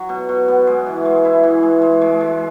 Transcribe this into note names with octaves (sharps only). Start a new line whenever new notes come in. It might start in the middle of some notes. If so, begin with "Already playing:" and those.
Already playing: F#3
B2
B2
B3
G#3
E3
G#3
E4
E3
G#3
G#3
G#3
G#3